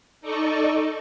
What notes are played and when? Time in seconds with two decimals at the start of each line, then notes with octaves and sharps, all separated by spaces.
0.21 D#4 A4 D5 D#5 C#6